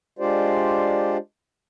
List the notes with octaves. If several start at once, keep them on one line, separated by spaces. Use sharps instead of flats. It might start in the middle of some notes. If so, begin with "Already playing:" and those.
G#3 D4 F4 G4 C5 D5